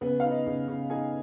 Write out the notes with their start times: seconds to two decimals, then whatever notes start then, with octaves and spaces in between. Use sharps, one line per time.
0.01 C#3 B3 B4
0.20 D#4 F5
0.31 D#4 D#5
0.47 C#3
0.68 C#3
0.90 D#4 G#4 G#5